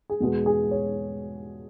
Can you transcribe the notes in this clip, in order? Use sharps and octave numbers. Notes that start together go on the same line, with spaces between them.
G#4
E2 B2 G#3 B3 F#4
G#4
C#5